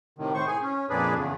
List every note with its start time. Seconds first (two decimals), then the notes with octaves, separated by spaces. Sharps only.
0.18 A2 C3 D#3
0.34 A2 C5 C#6
0.47 G#4 G#5
0.62 C#4
0.90 F2 A#2 D4 G#4 B4
1.16 E2 C#3